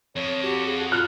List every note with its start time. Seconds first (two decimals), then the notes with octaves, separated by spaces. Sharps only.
0.16 F2 C#5
0.43 F#4 G4
0.66 G#4
0.92 F4 F6 F#6